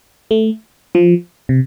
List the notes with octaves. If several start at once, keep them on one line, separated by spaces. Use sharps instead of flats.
A3
F3
C3